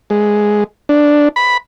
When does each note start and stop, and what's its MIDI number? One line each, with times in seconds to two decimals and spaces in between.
0.10 0.64 56
0.89 1.29 62
1.36 1.57 83